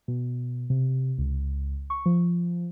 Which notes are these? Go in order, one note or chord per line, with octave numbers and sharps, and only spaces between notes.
B2
C3
C#2
C#6
F3